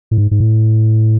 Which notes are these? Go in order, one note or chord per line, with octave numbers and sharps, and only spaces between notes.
A2
G#2
G#2
A2